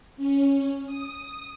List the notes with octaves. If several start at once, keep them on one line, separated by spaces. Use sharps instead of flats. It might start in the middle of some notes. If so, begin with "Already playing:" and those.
C#4
D#6